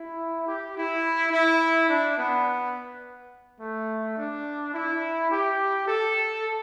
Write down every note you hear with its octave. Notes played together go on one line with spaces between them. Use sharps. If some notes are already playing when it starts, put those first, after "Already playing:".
Already playing: E4
G4
E4
E4
D4
B3
A3
D4
E4
G4
A4